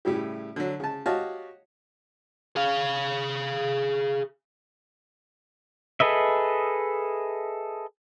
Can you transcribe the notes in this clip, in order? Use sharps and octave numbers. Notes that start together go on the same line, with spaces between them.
A2 C#3 G3 E4 G4
D3 F#3
C#3 A5
F#4 G4 C#5 D#5 F5 A5
G#4 F5
G#4 A4 B4 D#5 E5